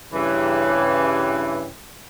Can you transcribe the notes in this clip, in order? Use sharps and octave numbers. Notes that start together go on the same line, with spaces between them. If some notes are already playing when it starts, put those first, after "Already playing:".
G2 C#3 E3